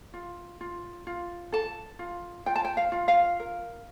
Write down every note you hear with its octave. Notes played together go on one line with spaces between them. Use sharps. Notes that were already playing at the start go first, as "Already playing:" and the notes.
F4
F4
F4
A4 A5
F4
F4 G5
A5
G5
F5
F4
F5
A#4